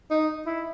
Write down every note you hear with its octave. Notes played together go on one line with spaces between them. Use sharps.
D#4
E4